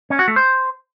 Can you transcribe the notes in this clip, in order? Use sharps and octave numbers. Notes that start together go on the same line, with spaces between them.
C#4
F#4
A3
C5